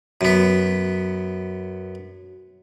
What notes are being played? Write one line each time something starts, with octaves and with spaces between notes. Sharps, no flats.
F#2 B3